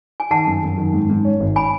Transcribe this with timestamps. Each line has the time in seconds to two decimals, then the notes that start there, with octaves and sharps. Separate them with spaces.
0.20 G#5
0.31 D#3 F#5 A5
0.47 F#2
0.63 F#2
0.78 D#3
0.93 G#2
1.10 G#2
1.25 C#4
1.40 G#1
1.56 G#5 B5